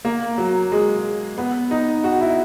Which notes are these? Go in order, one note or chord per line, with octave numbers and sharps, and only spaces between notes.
A#3
F#3
G#3
B3
D#4
F#4
E4